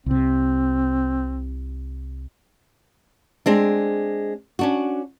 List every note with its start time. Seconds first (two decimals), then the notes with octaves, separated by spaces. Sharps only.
0.06 C2 C3 C4
3.46 G#3 C4 D4
4.59 C#4 D4 F#4